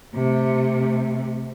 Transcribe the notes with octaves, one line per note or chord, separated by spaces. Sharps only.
C3 A3